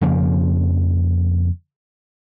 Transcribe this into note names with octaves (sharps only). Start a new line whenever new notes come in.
F2 C#3 F3 A#3